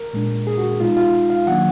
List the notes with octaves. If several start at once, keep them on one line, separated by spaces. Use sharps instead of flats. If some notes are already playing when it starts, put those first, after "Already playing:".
Already playing: A#4
A#2 G#3 D4
G#4
F#4
B2 G#3 D#4 F4
F4
F5
D#3 F#3 A#3 D4 F#5